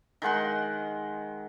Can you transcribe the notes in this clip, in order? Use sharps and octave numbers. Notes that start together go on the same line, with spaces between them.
D#3 G#3 F#5 C6